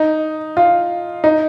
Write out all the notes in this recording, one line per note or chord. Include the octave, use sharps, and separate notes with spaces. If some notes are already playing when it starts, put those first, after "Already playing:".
Already playing: D#4
F4
D#4